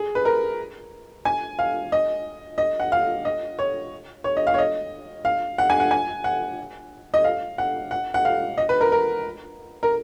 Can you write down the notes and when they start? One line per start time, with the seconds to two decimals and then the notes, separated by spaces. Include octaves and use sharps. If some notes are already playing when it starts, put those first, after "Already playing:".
Already playing: G#4
0.15 B4
0.25 A#4
1.25 G#5
1.59 F5
1.92 D#5
2.58 D#5
2.80 F#5
2.92 F5
3.25 D#5
3.59 C#5
4.24 C#5
4.37 D#5
4.47 F5
4.54 C#5
4.58 D#5
5.25 F5
5.58 F#5
5.70 G#5
5.80 F#5
5.91 G#5
6.24 F#5
7.14 D#5
7.24 F5
7.58 F#5
7.91 F#5
8.14 F#5
8.25 F5
8.58 D#5
8.69 B4
8.81 A#4
8.92 A#4
9.83 A#4